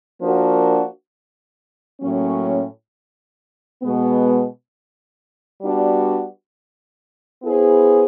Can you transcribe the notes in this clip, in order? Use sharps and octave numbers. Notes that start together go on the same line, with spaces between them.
F3 A#3 D4 F#4 A#4
A2 F#3 A#3 C#4
B2 G#3 B3
G3 B3 D4 F#4
B3 E4 G#4 C5